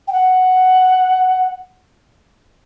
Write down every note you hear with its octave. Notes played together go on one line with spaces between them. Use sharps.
G5
F#5